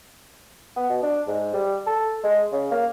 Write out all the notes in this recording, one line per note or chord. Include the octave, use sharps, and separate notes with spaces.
B3
B2
D4
G#2
G3
A4
G#3
C#3
A#3